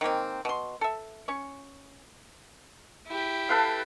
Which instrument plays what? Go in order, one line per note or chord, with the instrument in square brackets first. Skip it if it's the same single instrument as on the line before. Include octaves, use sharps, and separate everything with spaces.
[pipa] D#3 G#3 A#3 C4
B2 C6
A4 E5
C#4 C#6
[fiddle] E4 G4
[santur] A4 B4 F5